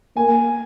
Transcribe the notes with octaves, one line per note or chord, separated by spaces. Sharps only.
A#3 G#5